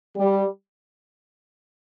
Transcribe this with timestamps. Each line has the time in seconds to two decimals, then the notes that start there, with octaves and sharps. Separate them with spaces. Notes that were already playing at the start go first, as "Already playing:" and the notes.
0.17 G3